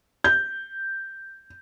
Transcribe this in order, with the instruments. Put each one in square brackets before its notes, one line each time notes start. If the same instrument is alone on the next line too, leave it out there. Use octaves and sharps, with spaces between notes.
[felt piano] G6